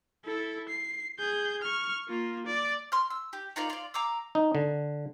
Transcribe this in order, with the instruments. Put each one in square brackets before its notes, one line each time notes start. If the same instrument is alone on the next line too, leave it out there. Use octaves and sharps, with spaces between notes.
[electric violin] E4 A4
C7
G#4 G6
C#6 F6
A#3 F4
D5
[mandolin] C6 F6
E6
G4
D#4 F4 A#4 D5
F4 D5
F5 A#5 D6 E6
[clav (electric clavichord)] D#4
D3